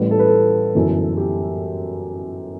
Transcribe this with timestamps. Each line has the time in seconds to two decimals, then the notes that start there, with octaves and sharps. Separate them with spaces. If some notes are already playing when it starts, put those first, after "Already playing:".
Already playing: A1 A2 G3 B4
0.11 A4
0.19 B4
0.27 A4
0.75 G1 F#2 E3
1.17 G4